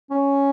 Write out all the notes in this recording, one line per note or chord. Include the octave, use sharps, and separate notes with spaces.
C#4